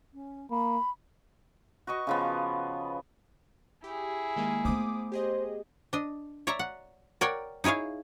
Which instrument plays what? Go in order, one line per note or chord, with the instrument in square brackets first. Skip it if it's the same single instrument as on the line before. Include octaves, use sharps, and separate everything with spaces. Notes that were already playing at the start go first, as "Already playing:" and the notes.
[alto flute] C#4
[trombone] A#3 [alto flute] B5
[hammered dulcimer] F#4 B4 D#5 C#6
C#3 F3 B3
[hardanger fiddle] E4 G#4 [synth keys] G4
[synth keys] D#3 G#3 A#3
[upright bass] A3 B3 [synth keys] C5 D6 D#6
[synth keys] G4 G#4 D#5 [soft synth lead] C5
[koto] D4 D#5
C#5 D5 E5 A#5
F#5
A#4 C#5 D5 F#5 G5
D#4 E4 G#4 C#5 F5